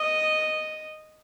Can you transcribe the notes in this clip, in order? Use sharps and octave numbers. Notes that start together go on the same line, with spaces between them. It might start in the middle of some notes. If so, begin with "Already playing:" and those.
Already playing: D#5